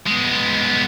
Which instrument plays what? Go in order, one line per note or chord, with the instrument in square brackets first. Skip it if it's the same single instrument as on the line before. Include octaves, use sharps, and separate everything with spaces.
[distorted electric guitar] G#3 B3